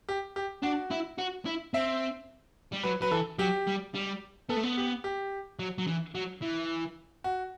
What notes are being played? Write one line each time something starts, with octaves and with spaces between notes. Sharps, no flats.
G4
G4
D4 F#4
E4
F#4
E4
C4 E5
G3
F#3 B4
F#3 B4
E3 A4
F#3 G4
G3
G3
B3 A4
A3
B3
G4
G4
F#3
F#3
E3
F#3
E3
F#4